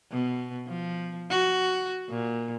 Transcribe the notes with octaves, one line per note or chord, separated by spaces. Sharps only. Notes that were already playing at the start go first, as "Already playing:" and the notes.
B2
F3
F#4
A#2